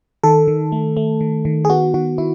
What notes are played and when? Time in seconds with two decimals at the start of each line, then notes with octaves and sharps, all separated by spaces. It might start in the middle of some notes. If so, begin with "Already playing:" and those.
0.24 D#3 A4
0.48 D#3
0.72 A3
0.97 A3
1.21 D#3
1.45 D#3
1.65 G#4
1.70 B3 F#4
1.94 D#3 F#4
2.18 D#3 E4